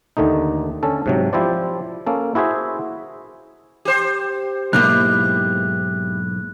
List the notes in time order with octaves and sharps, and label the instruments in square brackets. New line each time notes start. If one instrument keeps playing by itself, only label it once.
[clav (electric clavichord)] D#2 D3 D#3 A3 D#4
D3 C#4 A4
G#2 C3 F#3
F3 E4 G4 C5 D5
A#3 C#4 A4
E4 F#4 G#4 C5 E5
[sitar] G4 C5
[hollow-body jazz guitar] B1 G#2 A#3 [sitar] E4 G4 [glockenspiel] F#6